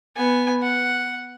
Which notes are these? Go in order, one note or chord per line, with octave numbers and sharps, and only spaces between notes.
B3 G#5
F#5